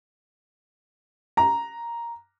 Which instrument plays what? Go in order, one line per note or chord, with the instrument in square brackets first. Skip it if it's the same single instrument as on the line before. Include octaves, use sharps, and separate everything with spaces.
[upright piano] A#5